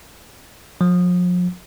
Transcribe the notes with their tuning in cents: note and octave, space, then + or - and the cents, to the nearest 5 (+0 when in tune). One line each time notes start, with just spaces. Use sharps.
F3 +40